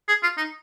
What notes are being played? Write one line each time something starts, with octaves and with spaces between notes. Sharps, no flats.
G#4
F4
D#4